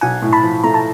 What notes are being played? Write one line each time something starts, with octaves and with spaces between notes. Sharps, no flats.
B1 F#5 G#5
A2
A5 B5
F3
A3 A#5
A5